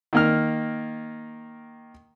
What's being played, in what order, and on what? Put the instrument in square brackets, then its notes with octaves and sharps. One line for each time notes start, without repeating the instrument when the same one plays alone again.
[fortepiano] D#3 A#3 F6